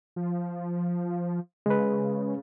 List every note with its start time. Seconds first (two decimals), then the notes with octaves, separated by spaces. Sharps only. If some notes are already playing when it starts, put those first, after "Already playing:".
0.16 F3
1.66 C#3 G#3 B4